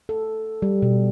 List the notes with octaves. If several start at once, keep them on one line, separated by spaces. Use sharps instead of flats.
A4
G3
B2